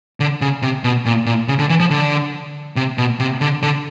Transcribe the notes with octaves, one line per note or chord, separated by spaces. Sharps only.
D3
C#3
C3
B2
A#2
A#2
C#3
D3
E3
F3
D3
C3
B2
C3
D3
D3